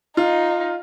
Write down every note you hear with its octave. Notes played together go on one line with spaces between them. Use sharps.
D#4 F4